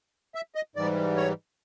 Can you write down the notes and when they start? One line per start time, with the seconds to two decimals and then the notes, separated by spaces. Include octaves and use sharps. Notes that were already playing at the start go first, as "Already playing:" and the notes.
0.35 E5
0.55 D#5
0.76 G#2 E3 G3 D5
1.16 C#5